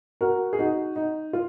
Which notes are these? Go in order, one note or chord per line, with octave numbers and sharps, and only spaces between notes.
F#4 A#4
G#4
D#4 F#4
D#4
F4